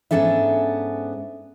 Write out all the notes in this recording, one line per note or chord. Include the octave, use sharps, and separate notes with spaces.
G#2 B3 C#4 D4 A4 E5